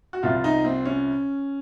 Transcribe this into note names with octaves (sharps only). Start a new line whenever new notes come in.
F#4
C2 C3 F3 F4
D#4
C4
C#4